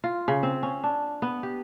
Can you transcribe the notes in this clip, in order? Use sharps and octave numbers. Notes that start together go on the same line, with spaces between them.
F4
C#3
C4
C#4
D4
B3
G4